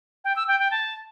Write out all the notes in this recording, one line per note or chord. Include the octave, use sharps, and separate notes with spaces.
G5
E6
G5
G5
A5